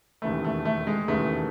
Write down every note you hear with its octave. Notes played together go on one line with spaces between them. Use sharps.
E1 D#2 C#3 E3 A3
A3
A3
G#3
E1 D#2 C#3 E3 A3